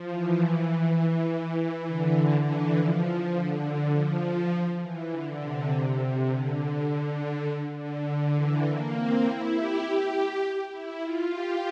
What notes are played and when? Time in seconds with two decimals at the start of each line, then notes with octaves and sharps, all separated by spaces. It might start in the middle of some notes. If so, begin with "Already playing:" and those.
Already playing: F3
0.11 E3
0.70 E3
1.58 E3
1.87 D3
2.17 D3
2.47 E3
2.76 F3
3.05 F3
3.35 D3
3.94 F3
4.82 E3
5.12 D3
5.41 C3
5.71 C3
6.29 D3
6.59 D3
7.17 D3
7.77 D3
8.35 E3
8.65 A#3
8.95 C4
9.24 E4
9.54 G4
10.71 E4
11.01 F4
11.30 G4